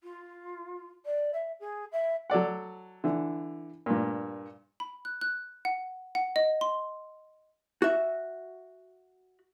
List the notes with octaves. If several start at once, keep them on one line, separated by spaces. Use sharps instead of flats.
F4
D5
E5
G#4
E5
F#3 A4 D5 F#5
D3 E3
G2 A#2
B5
F#6
F#6
F#5
F#5
D#5
C6
F#4 E5